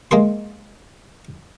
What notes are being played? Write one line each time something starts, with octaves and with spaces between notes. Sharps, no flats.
G#3 A#3 G#4 C6